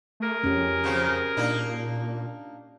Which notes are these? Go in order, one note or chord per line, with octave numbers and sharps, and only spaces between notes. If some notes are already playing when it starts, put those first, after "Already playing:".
A3 G#4 A#4
F2 C#4 G4
C#3 F#3 C4
A#2 A#3 D4 D#4